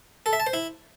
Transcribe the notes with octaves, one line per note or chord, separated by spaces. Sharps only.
A4
E5
A5
C5
E4